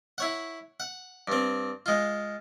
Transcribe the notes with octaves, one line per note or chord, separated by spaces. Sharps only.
E4 C#5 F#5
F#5
G2 C4
G#3 F4